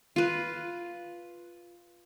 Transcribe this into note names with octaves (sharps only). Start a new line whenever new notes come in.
F4 B4